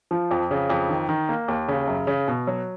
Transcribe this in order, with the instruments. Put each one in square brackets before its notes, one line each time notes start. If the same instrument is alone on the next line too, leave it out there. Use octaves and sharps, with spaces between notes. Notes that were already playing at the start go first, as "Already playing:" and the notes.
[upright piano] F3
F2
C#3
F2
D#3
D#3
A#3
D#2
C#3
F#2
C#3
B2
F#3